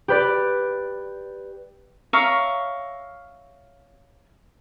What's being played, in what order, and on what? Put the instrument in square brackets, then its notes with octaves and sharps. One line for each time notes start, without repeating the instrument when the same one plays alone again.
[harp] G4 B4 D5
[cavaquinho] C#5 E5 F5 A#5